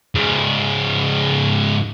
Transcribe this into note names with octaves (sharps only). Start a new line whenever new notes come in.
G#2 C#3